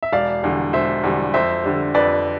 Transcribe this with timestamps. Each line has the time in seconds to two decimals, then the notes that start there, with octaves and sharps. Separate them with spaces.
0.03 E5
0.12 E1 D5 F5
0.42 E2 D3 G3
0.73 E1 C5 E5
1.03 E2 D3 G3
1.34 F2 C5 E5
1.64 D3 G3
1.94 F2 B4 D5